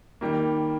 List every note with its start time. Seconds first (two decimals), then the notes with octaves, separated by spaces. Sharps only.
0.21 D#3 G3 A#3